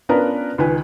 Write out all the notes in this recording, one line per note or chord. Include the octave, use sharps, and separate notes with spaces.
B3 C#4 D4 F4 A#4 B4
C#2 D#3 B4 G#5